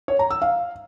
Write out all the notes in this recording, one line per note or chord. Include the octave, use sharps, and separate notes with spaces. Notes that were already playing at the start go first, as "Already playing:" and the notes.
C#5
A#5
E6
F5